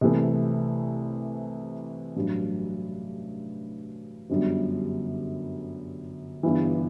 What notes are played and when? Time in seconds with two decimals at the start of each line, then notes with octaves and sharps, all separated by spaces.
0.01 C2 C3 E3 A3
2.16 A1 G2 F#3
4.30 G1 F#2 D3 G3
6.43 G1 G2 E3